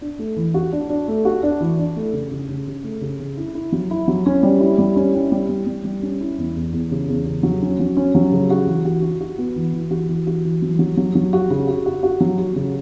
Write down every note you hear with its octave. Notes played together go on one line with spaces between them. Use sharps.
D4
A3
E3
F#4
D4
D4
A3
F#4
D4
E3
D4
A3
C#3
C#3
C#3
C#3
A3
C#3
C#3
E4
E4
F#3
E4
F#3
C#4
G3
E4
G3
C#4
E4
G3
G3
G3
G3
C#4
E4
E2
E2
E2
C#3
E2
C#3
F#3
C#4
F#3
C#4
F#3
C#3
F#4
E3
F#4
F#4
F#4
B3
E3
E3
F#4
E3
F#4
E3
F#3
F#3
F#3
F#3
F#4
C#3
F#4
F#4
F#4
F#3
F#4
C#3